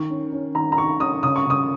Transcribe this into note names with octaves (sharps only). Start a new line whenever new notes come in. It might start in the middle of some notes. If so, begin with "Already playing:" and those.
Already playing: D#3 C#6
C#4
C#4
D#3 A#5
A#5
D#3 C#6
C#4 D#6
C#3 D#6
C#6
C#3 D#6